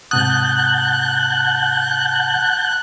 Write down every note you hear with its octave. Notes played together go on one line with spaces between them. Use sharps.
G#2 C3 F#5 A5 D#6 F#6 G6